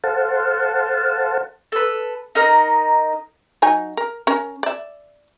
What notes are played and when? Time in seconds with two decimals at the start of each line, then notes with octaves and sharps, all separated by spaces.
0.04 A4 C5 F5 F#5 A5
1.72 A4 B4
2.35 D#4 A#4 D#5
3.62 F#3 D#4 G#5
3.97 A#4
4.27 C#4 A#4
4.63 D5 E5